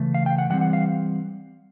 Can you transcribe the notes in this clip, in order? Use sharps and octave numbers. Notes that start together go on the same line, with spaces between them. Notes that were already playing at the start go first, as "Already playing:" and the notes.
Already playing: C#3 E3 A3
F5
G5
F#5
E3 G3 C4 F#5
F#5
F5